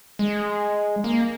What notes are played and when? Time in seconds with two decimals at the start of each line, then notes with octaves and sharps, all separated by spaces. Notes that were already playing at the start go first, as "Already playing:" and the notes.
0.19 G#3
1.04 A#3